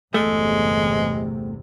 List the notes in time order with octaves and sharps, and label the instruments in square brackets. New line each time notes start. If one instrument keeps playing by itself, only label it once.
[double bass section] G1 E2 C3 [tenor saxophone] G#3 [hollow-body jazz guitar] A3